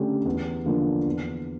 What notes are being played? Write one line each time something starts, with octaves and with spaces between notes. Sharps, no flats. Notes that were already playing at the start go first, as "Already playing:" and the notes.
Already playing: D3 A3 C#4 G4
E2
D3 F3 A#3 D4
E2